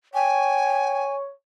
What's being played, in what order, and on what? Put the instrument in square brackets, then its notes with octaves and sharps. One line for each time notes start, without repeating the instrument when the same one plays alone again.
[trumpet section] C#5 [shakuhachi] G5 [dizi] G#5